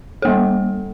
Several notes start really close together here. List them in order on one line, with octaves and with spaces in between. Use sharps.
A4 A#3 G3